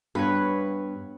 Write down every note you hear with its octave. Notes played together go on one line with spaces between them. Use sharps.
G2 B3 B4 C#5